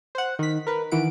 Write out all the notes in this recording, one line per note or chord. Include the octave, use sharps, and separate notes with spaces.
C5 F#5
D#3 B6
A#4 B4
D#3 E3 E4 F#5 D7